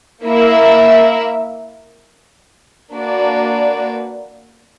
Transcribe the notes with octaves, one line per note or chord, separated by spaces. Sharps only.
A#3 E4 A#4 E5
A#3 D4 F#4 B4 D5